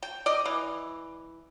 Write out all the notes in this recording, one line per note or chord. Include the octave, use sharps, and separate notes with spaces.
G5
D5 D#5
E3